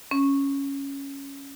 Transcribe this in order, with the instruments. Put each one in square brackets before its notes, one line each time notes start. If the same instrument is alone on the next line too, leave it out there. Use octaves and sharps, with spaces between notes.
[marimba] C#4